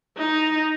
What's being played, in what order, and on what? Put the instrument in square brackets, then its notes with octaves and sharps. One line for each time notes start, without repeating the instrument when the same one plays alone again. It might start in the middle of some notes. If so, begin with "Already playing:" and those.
[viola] D#4